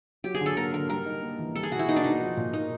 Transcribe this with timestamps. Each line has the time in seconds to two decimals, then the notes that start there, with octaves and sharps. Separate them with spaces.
0.24 F#3 G4
0.35 G#4
0.41 D3
0.46 A4
0.57 A#3 A#4
0.73 D3 A#4
0.90 G3 A#4
1.06 D#4
1.23 A#3
1.39 E3
1.55 G3 A4
1.63 G#4
1.71 B2 F#4
1.79 E4
1.88 A#3 D#4
1.96 D4
2.04 B2 D#4
2.21 F3
2.37 A#2
2.53 A#3 D#4